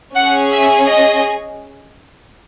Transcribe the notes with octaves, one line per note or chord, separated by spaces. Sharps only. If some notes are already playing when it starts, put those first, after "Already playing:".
C#4 G#4 F#5
E5
D#5